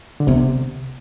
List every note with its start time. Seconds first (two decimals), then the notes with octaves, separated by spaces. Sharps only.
0.20 D3
0.27 C3 B3